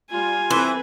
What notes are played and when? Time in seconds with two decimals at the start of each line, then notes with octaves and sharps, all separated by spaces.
0.10 G3 F4 G#5
0.50 E3 C4 A4 B4 C5